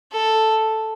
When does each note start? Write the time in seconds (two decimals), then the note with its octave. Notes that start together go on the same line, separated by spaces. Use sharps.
0.12 A4